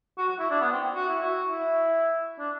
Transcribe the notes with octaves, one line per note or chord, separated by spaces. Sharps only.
F#4
F#4
E4
D4
B3
C4
F#4
E4
F#4
E4
D4